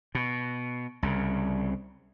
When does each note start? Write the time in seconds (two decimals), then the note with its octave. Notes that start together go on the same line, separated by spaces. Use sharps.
0.15 B2
1.03 C2 C#3